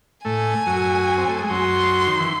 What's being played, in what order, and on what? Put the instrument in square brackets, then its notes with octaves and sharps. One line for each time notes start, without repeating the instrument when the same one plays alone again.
[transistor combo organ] A2 A3 [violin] G#5
[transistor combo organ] F#2 F#3
C4
A3
G#3
[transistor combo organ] F#2 F#3 [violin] C6
[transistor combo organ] D#3
E3